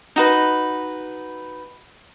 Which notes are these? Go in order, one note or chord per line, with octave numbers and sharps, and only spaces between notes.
D#4 F#4 B4